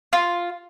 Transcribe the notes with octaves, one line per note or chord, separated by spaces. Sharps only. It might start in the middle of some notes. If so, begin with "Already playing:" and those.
F4